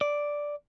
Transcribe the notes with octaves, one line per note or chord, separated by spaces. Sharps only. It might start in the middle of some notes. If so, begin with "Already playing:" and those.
D5